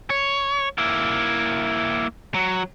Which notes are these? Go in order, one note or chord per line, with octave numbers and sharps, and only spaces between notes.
C#5
A#3 E4
F#3